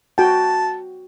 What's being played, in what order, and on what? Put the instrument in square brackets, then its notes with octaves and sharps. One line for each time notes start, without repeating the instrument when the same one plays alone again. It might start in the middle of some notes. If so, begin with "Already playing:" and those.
[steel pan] F#4 G5 [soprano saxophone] A5